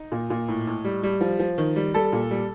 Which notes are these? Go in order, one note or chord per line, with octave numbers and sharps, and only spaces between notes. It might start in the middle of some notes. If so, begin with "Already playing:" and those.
Already playing: D#4
A#2
A#2
A2
A2
G3
G3
F3
F3
D#3
G3
G3 A4
A#2
G3